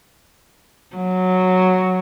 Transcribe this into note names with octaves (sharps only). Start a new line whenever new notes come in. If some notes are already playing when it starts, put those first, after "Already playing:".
F#3